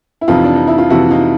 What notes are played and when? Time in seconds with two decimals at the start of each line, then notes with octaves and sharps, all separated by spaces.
0.21 E4
0.28 F2 C3 E3 D#4 F4
0.44 D4
0.55 D#4
0.67 E4
0.78 F4
0.90 F2 C3 E3 E4 F#4
1.10 D#4 F4